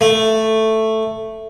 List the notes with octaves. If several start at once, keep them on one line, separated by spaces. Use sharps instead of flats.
A3